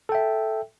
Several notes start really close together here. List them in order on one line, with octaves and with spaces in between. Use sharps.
A4 G5 E5